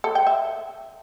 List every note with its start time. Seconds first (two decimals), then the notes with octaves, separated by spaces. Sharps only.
0.04 A4
0.15 G5
0.27 E5